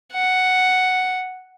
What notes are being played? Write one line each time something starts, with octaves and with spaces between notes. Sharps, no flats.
F#5